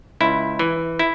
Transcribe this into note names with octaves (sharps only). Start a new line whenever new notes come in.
C#2 E4
E3
E4